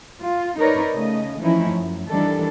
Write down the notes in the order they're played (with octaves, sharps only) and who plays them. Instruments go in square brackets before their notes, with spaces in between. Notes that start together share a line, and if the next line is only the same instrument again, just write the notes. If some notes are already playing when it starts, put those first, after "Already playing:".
[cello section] F4
D#4 A#4 B4 C#5 D5
C#3 A3 D#5
E3 F3 A3 C#4 D#4 E4
F#2
D#3 E3 G3 D4 A4